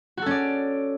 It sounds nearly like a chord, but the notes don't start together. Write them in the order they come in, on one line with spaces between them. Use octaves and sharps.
F#4 A4 C#4 D5